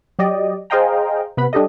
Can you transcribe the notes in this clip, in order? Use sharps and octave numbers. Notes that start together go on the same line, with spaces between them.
F#3 G4 D5 D#5
G#4 C5 D#5 F5 G5 A#5
C3 B3 B4 B5
G3 D4 G4 A4 D#5